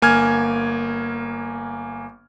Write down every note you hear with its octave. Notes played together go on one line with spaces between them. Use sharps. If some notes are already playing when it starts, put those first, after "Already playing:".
G1 A#3 G#5 F6 G#6